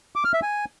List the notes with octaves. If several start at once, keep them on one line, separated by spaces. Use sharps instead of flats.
D6
F6
E5
G#5